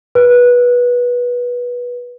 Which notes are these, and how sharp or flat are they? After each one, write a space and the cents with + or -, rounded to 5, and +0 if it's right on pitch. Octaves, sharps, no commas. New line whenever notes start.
B4 -20